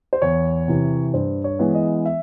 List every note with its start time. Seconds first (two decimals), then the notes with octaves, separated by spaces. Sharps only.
0.13 C5
0.22 E2 C#5
0.68 C3 E3
1.14 G2 C5
1.44 C#5
1.59 E3 G#3 B3
1.75 D#5
2.05 E5